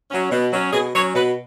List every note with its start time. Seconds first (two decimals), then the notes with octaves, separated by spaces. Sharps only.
0.10 F#3 C#4
0.31 B2
0.52 F#3 C#4
0.72 B2 G#4
0.94 F#3 C#4 C#5
1.15 B2 B4